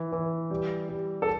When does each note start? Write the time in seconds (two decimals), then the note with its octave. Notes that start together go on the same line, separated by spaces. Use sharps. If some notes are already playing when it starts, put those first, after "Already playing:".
Already playing: E3
0.12 E3
0.51 G3
0.89 G3
1.22 A4